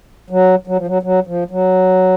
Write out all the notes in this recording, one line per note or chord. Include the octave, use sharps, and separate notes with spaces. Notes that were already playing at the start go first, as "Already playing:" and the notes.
F#3
F#3
F3
F#3
F#3
F3
F#3